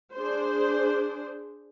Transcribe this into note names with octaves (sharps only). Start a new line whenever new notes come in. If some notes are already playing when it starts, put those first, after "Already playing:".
D4 G#4 C5